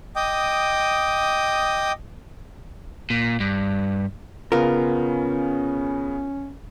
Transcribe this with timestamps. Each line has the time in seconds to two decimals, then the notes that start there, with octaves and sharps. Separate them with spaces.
0.16 D#5 G5 D6 D#6
3.10 A#2
3.40 G2
4.52 C#3 B3 C#4 F4 A#4